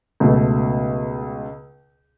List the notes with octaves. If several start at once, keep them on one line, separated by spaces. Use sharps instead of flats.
C#2 B2 A3